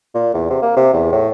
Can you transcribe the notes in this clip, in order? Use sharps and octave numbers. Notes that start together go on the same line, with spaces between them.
A#2
E2
C3
A#3
C3
E2
A2